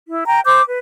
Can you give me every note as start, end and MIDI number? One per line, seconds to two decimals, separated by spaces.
0.08 0.23 64
0.27 0.41 79
0.27 0.41 82
0.45 0.62 72
0.45 0.62 86
0.45 0.62 91
0.68 0.78 71